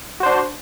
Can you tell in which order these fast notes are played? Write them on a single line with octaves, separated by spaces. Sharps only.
F#4 C5 D4